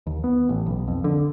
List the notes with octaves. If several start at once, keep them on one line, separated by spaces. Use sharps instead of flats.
D#2
B3
A1
B1
F2
D3